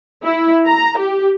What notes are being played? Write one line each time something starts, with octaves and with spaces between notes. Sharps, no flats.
E4
A#5
G4